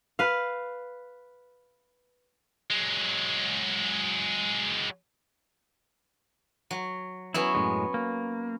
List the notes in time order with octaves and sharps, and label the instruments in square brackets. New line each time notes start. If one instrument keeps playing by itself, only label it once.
[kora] B4 F5
[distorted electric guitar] F#3 G#3
[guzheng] F#3
[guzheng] F#3 B3 C#4 [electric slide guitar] E4
[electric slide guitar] F#2 A2 G#3
A#3